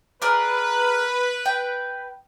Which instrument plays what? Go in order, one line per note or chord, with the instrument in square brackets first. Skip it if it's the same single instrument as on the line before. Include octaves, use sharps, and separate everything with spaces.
[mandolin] G#4 A#4 D5 [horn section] B4
[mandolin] G5